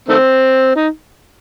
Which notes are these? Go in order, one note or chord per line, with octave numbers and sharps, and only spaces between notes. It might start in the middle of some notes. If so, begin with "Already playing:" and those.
D#3 A3 C4
D#4